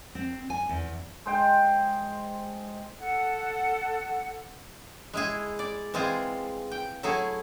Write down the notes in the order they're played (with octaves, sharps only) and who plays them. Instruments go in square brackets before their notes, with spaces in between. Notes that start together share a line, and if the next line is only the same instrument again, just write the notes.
[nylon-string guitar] C4
G#5
E2
[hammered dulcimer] G#3 C5 G5
[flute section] A4 F#5
[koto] G#3 E4 G#4
D5
E3 G#3 C4 F4 G#4
G5
F#3 A3 E4 G#4